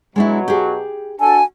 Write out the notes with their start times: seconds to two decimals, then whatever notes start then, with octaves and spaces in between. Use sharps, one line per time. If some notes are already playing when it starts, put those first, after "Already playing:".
0.16 B2 F#3 G#3 D4 E4
0.48 G4 G#4
1.20 D4 F#4 A4 G#5